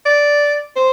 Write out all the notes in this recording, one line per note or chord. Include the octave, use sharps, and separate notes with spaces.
D5
C5